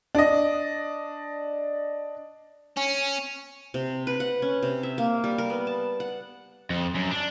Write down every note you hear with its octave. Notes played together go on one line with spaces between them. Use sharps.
D4 D#5
C#4
C3
B4
F#5
C#4
C3
E5
A#3
G3
A#4
B3
A5
F#5
F2
F#2
D4